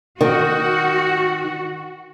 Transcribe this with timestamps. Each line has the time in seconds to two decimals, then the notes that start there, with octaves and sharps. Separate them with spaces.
0.21 D#3 F#4